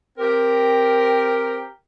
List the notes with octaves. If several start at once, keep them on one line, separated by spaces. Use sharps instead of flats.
C4 G4 A#4